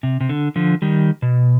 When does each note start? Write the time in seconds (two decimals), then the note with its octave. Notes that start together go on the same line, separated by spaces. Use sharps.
0.03 C3
0.21 C3
0.29 D3
0.56 D3 F3
0.82 D#3 G3
1.22 B2